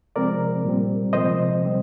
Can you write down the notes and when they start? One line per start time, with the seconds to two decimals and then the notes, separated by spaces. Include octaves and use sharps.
0.16 C3 F3 G#3 C4 A#4 D5
0.64 A#2 G3 C4
1.13 C3 F3 G#3 C4 C5 D#5
1.62 C3 G3 C4